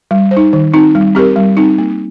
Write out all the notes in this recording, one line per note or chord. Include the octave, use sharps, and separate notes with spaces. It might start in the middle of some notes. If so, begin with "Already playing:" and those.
G3
C5
D#4
D#3
C4 D#4
G3
C4 G4 A#4
G3
C4 D#4
A#3